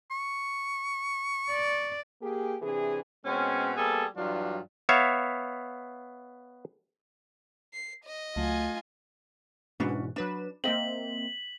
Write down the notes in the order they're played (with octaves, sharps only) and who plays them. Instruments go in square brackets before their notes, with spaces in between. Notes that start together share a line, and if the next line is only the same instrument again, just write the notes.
[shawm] C#6
[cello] D5
[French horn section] A#3 G4 G#4
C3 E3 D4 G#4
[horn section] B2 G#3 C4 C#4
G3 A#3 B3 G#4 A4
G2 E3 F#3 D4 F4
[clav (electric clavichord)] B3 C#5 E5 F5
[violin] C7
D#5
[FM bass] C#2 [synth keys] F#3 A3 [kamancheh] F4 G#5
[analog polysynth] G#2 B2 E3 [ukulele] C#4 D4 F#4
[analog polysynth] F#3 B4 E7 [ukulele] D4
[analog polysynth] A#3 C4 [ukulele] D#5 E5 [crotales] B6 F#7